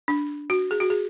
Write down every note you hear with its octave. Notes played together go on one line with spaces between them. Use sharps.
D4
F#4
G#4
F#4
G#4